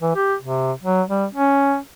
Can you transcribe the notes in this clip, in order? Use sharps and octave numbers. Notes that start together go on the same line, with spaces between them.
E3
G4
C3
F#3
G3
C#4